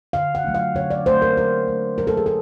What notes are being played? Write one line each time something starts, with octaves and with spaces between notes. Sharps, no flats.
D3 F5
F#5
F#3 A3 D4
F5
D3 C#5
D5
F#3 A3 D4 C5
A#4
F#3 A#4
A3 D4
F#3 A#4
A4
G#4
A4